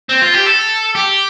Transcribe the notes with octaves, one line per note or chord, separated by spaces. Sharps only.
C4
F4
G4
A4
G4